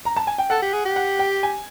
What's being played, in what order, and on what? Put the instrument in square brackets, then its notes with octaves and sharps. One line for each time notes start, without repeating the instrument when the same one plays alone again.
[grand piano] A#5
A5
G#5
G5
[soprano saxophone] A4 [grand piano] F#5
[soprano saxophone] G4
G#4
G4
[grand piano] F#5
G5
G#5